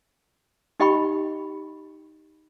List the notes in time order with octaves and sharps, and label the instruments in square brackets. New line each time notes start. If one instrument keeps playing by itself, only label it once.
[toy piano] D#4 G4 D#5 G5 B5 C#6